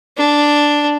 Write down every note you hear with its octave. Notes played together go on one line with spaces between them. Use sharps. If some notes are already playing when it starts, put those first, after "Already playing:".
D4